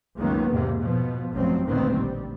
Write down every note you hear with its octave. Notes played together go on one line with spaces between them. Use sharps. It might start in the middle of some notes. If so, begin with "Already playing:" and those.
C#2 F#2 D#3 A#3 B3
E2 G#2 C3 A#3
B2 F3 B3
A1 F#2 F3 F#3 C4
A1 D2 A#2 D#3 B3 C4
G3